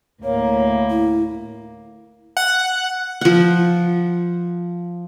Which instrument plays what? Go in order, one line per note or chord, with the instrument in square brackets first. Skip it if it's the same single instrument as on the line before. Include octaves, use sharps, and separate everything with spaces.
[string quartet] D2 A2 A#3 [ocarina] C#5
[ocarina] E4
[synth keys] F#5
[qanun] F3 F#5